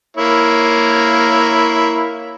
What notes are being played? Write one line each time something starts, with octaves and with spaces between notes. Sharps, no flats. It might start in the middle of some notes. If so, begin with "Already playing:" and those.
A#3 E4 C#5